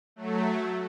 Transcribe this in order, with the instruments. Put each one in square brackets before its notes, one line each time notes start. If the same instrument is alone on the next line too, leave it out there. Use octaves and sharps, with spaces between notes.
[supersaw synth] F#3 A3